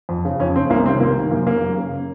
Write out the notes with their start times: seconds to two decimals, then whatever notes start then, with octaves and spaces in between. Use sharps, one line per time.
0.09 F2
0.25 C#3
0.40 F2 C#4
0.55 C#3 C4
0.70 C2 A#3
0.86 C3 C4
0.90 D#3
1.00 C2 A#3
1.16 C3 D#3
1.31 F#2 A#3
1.46 C#3 A#3
1.61 F#2
1.77 C#3